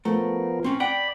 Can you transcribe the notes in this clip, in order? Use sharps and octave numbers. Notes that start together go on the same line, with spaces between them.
F3 A3 B3 A#4
C4 C#4
D5 F#5 G5 B5